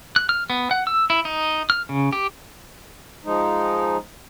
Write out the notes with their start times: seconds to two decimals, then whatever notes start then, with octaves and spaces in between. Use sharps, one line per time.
0.16 F#6
0.29 F6
0.50 B3
0.71 F#5
0.87 E6
1.10 E4
1.25 D#4
1.70 F6
1.89 C#3
2.13 G4
3.25 F3 G#3 D#4